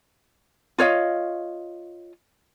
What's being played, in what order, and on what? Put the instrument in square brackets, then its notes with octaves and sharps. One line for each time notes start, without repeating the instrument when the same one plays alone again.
[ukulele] F4 C#5 D#5 F5